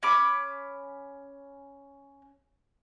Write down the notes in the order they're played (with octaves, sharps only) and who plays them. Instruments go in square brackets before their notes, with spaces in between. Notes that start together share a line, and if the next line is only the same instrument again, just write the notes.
[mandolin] C#4 B5 D6